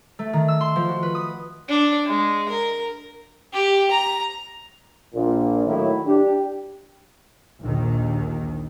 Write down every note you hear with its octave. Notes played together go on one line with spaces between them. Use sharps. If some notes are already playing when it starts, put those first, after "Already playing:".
A3
D#3
E6
C6
F3
F#4
B4
D#6
D4
G#3
A#4
G4
A#5
A#1 A#2
A2 D#3 F#3 A#3 E4
D4 G4
A#1 D#2 D#3